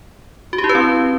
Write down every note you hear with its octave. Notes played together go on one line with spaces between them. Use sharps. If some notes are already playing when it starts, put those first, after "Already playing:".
F#4
G4
E4
B4
C4